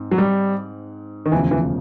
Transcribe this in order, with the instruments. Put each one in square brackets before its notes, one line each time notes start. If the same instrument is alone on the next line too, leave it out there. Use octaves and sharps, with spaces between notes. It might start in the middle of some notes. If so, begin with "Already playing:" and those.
Already playing: [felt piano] G#2 C4
[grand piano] F#3
G3
D#3
[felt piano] E1 D2 C#3 F3 [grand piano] E3
[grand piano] E3